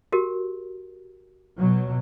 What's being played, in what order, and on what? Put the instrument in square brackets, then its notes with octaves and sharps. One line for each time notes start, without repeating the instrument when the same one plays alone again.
[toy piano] F#4 G4 A#4
[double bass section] B2 F#3